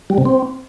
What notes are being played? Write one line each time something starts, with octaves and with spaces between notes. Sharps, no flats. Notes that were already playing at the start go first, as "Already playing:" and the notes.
G3
C3
C4